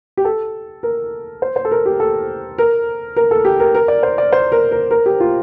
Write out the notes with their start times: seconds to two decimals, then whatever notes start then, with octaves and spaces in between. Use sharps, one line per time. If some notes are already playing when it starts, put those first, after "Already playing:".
0.17 G4
0.25 A4
0.83 A#4
1.42 C5
1.56 C5
1.65 A4
1.71 A#4
1.86 G4
2.00 A4
2.58 A#4
3.16 A#4
3.31 A4
3.45 G4
3.60 A#4
3.75 A#4
3.88 D5
4.03 C5
4.18 D5
4.32 C5
4.52 A#4
4.72 A#4
4.91 A#4
5.06 G4
5.20 F4